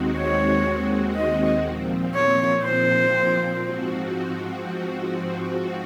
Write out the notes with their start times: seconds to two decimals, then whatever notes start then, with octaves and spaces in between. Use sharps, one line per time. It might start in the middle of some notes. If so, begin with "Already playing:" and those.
Already playing: D#2 D#3 G#3 C4 F#4
0.18 C#5
1.16 D#5
1.66 A#2 F3 C4
2.15 C#5
2.64 C5
3.63 G#2 F3 C4 F#4